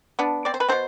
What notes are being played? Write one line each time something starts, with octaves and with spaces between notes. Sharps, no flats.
B3 D4
C4 D5
C5
B4
B2 C4 C5